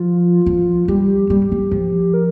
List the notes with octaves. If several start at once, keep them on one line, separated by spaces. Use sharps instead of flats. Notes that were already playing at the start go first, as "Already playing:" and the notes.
Already playing: F3 F4
F3
G3 G4
G3 G4
G3
F3
A#4